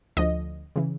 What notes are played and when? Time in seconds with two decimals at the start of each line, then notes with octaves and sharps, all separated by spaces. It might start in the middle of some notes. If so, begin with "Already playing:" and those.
0.17 D2 D3 F3 D#5
0.76 C#3 E3